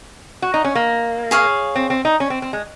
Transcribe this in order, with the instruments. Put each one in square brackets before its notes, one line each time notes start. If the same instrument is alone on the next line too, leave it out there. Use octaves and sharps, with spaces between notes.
[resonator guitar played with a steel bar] F#4
D#4
C#4
A#3
[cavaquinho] G#4 C#5 F5
[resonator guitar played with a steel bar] C4
C4
D#4
C#4
C4
C4
G#3